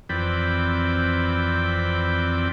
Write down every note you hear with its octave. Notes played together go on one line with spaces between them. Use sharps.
F2 E3 C4 D5 G5 B5